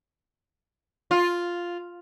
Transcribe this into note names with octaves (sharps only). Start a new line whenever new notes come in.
F4